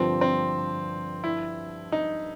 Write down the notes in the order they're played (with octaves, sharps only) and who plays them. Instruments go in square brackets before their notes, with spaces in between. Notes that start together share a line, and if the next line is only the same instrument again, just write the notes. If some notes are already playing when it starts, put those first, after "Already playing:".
Already playing: [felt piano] G2 D3 F3 [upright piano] C4
[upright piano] C4
E4
D#4